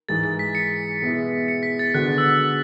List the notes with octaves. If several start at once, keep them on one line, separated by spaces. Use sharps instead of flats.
G#2 E3 G#3 A6
A6
B6
C#7
B2 G#3 B3 E4
C#7
B6
A6
D3 G#3 B3 F#4 F#6
E6